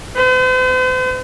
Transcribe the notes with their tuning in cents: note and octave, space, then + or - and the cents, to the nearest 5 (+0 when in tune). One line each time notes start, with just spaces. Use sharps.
C5 -45